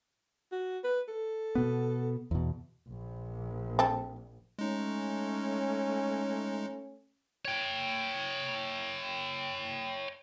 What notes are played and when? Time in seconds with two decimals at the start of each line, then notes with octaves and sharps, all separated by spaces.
0.52 F#4
0.84 B4
1.08 A4
1.55 B2 B3
2.31 E2 B2
2.88 A#1
3.79 C4 A4
4.59 G#3 A3 C#4 D#4
7.45 C#5 G5